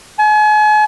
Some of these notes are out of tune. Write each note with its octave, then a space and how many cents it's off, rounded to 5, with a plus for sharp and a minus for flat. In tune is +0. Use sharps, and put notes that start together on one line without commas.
G#5 +40